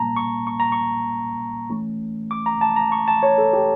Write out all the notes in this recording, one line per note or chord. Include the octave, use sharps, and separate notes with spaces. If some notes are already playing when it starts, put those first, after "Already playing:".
Already playing: A#2 G3 A#3 C#4 A5 A#5
C#6
C#6
A#5
C#6
E3 A3 C#4
D6
A#5
A5
A#5
C#6
A5
C#5
A4
G4